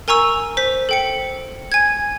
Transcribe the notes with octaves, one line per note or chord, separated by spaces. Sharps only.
A#4 G#5 A#5 C#6 E6
C5 B6
A4 G5 C#7
G#5 G#6